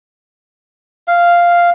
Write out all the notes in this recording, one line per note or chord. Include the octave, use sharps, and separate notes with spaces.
F5